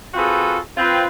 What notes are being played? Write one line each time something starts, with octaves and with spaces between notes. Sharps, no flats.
C4 F4 F#4 G#4 A4 B4
C4 F4 B4